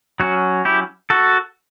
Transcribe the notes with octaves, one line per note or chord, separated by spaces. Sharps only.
F#3 C#4 F#4
E4 G4
F#4 A4